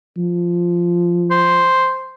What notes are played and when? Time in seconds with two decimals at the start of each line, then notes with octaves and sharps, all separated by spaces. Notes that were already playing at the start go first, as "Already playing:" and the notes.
0.17 F3
1.31 C5